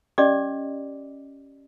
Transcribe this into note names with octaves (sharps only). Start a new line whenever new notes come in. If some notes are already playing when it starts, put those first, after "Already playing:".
C#4 G4 D5 D#5 D6